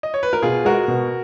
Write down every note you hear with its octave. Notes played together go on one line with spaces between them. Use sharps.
D#5
C#5
B4
A#4
B2 F4 G#4
G#3 F#4 A#4
B2